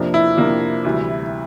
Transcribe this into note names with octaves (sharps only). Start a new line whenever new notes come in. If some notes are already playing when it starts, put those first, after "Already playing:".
Already playing: F2 C3 F3 A#3 D4
E4
F2 C3 F3 A#3 D4
D2 C3 E3 G3